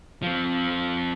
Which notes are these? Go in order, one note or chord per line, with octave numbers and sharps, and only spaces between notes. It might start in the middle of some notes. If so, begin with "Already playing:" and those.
F3 C4